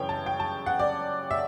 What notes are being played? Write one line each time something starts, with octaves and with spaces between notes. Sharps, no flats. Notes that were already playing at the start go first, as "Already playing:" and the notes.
Already playing: G1 F#2 C#3 E3 C#5 G5
A5
G5
A5
F#5
D5
E5